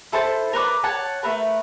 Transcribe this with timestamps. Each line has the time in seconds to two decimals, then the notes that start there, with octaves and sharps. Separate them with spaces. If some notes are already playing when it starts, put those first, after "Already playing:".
0.12 E4 A4 C5 A5
0.53 A#4 B4 C#5 D5
0.84 C#5 F#5 A5
1.23 A3 A#4 B4